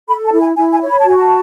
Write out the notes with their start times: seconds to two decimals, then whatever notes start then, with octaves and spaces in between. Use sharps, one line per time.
0.09 A4 B5
0.25 A5
0.32 E4
0.41 G#5
0.57 E4 G#5
0.73 G#5
0.81 C#5
0.90 B5
0.99 A5
1.05 F#4 G#5
1.17 A5